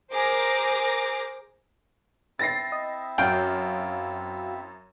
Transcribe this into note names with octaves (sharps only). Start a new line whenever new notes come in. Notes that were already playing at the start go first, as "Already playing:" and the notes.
G#4 A#4 C5 D6 A#6
C4 E4 E5 A6 A#6 C7
D#5
F#2 F#4 F5 G5